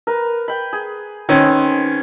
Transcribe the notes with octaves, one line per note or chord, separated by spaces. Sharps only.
A#4 B4
G5 B5
G#4
D#3 G#3 C4 C#4 B4